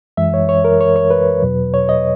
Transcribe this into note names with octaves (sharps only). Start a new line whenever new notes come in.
F#2 E3 G#3 E5
C#5
C#5
A#4
C#5
C#5
B4
E2 B2 F#3
C#5
D#5